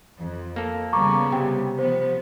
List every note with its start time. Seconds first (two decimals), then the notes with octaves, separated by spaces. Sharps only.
0.18 F2
0.56 A#3 A4
0.93 C#3 G3 B3 A#5 C#6 D6
1.32 C3 G5
1.79 F3 B3 C5